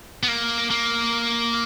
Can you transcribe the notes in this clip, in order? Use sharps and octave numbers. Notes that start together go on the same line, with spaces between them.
B3
A#3
A#3